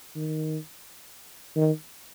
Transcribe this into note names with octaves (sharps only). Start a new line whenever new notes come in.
D#3
D#3